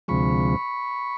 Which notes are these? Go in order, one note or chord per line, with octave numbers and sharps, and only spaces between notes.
D2 C3 F3 G#3 B5 C#6